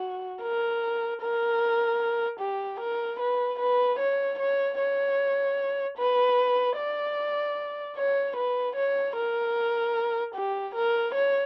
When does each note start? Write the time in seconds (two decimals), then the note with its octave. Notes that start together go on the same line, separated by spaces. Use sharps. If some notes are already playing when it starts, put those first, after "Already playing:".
Already playing: F#4
0.42 A#4
1.21 A#4
2.40 G4
2.80 A#4
3.20 B4
3.59 B4
3.99 C#5
4.39 C#5
4.79 C#5
5.98 B4
6.77 D5
7.97 C#5
8.36 B4
8.76 C#5
9.16 A#4
10.35 G4
10.75 A#4
11.15 C#5